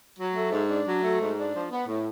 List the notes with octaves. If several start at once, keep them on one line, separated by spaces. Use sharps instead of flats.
F#3
A3
G#2
D4
F#3
A3
G#2
D4
F3
B3
A2